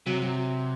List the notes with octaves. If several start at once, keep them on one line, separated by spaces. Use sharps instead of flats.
C3 F#3
F#3